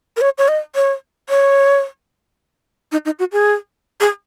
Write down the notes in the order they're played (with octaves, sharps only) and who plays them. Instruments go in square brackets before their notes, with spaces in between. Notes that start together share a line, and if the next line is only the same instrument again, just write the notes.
[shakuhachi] A#4
C#5
C#5
D#5
C#5
C#5
D#4
D#4
F#4
G#4
G#4